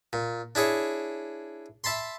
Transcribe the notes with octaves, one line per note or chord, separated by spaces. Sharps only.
A#2
D4 E4 G#4 C#5
E5 A5 B5 C6